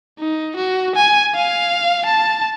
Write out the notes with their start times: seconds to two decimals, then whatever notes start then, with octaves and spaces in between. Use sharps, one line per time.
0.19 D#4
0.56 F#4
0.96 G#5
1.35 F5
2.06 A5